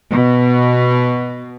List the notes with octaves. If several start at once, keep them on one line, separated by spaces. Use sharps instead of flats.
B2